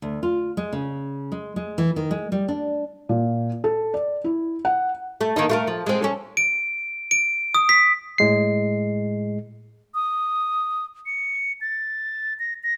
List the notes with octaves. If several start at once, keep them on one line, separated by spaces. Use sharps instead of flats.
D2
F4
G#3
C#3
G#3
G#3
E3
D#3
G#3
G3
D4
A#2
A4
D5
E4
F#5
A3
D#3 A#3 D#4
A3 F4 A#4
F3
G#3 C4
C#4 A4
D7
D7
D#6
B6
A2 G#3 C7
D#6
C#7
A6
A#6
A#6